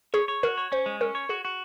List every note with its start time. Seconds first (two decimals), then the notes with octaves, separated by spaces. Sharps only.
0.14 G#4 C#5
0.28 C#5
0.43 F#4 A#4
0.58 C#5
0.72 C#4 C5
0.86 G#3
1.01 C#4 A#4
1.15 C#5
1.29 F#4 G#4
1.45 F#4